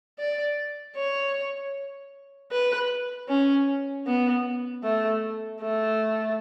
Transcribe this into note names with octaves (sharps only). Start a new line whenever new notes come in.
D5
C#5
B4
C#4
B3
A3
A3